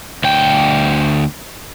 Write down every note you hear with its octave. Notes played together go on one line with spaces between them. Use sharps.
D2 G5